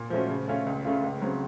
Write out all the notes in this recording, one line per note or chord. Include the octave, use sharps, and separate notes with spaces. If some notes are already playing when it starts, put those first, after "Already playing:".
Already playing: A#2
F3 A3 C#4 F#4
C#3
A3 C#4 F4
C#2
C#3 A3 C#4 F4
C#2
C#3 F#3 C4